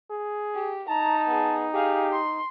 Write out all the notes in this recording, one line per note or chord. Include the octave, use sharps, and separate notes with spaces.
G#4
G4
D#4 A5 A#5
B3 G#4
G4 G#4 F5
C6